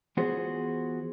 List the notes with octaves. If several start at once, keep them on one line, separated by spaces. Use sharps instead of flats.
E3 B3 F4 F#4 G#4 C5